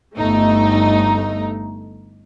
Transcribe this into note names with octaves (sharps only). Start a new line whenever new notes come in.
G1 A3 D#4